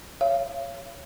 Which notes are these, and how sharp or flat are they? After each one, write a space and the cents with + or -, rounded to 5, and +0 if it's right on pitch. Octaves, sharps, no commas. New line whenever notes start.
C#5 +0 F5 -40